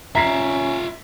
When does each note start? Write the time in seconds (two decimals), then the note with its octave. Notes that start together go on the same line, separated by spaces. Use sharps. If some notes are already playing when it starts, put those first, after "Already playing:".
0.15 C#4 F4 E5 A#5 B6 C7